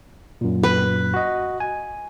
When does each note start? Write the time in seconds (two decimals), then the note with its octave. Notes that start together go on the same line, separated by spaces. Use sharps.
0.41 F#2 A#2
0.63 B4
1.14 F#4 D#5
1.60 G#5